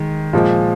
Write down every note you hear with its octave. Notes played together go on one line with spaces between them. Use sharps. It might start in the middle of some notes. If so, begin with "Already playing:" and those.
Already playing: D#3 G#3
A#2 F3 G#3